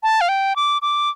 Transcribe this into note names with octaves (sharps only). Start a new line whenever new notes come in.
A5
F5
G5
D6
D6